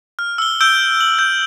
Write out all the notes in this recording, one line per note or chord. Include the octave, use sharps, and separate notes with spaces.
F6
E6 G7
E6 G6 D7 G7
F#7
G6